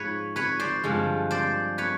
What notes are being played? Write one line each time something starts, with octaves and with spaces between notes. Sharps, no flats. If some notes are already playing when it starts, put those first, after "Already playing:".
Already playing: G#2 F3 B4 C#5
B4 C#5
C5 D5
G2 D3 F3 G#3
C5 D5
B4 C#5